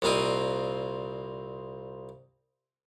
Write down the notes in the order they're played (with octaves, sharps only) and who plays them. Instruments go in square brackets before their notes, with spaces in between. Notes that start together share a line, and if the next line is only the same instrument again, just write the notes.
[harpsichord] C2 A#2 A#3 C4 D#5